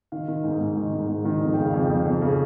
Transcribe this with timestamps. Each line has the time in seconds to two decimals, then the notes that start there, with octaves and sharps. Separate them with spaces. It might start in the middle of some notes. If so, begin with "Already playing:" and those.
0.12 D#3 F5
0.28 D#3
0.44 G#2
0.61 G#2
0.77 D#3
0.93 G#2
1.09 G#2
1.25 D#3
1.41 F2
1.54 C#3 G5
1.65 F5
1.73 F2 G5
1.90 F2
2.05 F2
2.22 C#3